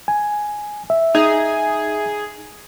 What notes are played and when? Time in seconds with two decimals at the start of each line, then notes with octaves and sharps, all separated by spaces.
0.08 G#5
0.90 E5
1.15 D#4 G#4